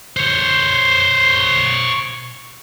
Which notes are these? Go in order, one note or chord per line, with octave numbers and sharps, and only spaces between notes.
C5 C#5